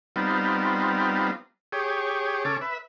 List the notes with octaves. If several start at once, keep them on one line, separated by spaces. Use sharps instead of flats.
G3 B3 C4 D#4 F4
G4 G#4 C#5
C#3 C#4 A4 D6
B4 E5